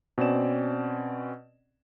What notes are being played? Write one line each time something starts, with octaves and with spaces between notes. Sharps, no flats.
B2 C4 C#4 D5 E7